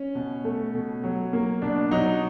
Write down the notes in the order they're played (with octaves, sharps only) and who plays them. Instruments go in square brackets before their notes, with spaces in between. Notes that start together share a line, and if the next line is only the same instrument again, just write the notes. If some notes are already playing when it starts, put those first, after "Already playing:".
Already playing: [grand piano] C#4
B2
A3
B2
F#3
A#3
B2 D4
F#3 D#4